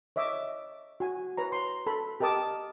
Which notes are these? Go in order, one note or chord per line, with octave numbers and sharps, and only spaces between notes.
C#5 D#5 E5 D6
F#4 G#5
B4 C#5 A#5
C6
A4 B5
G4 A#4 D#5 A5 D6 D#6